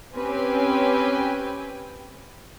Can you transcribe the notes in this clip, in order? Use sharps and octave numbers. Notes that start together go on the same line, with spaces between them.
C4 C#4 G4 B4 G5 G#5